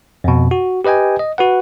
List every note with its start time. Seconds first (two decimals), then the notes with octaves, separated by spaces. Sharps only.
0.24 F2 B2
0.51 F#4
0.85 G4 B4 D#5 G5 G#5
1.19 D#5
1.38 F#4 B4 F#5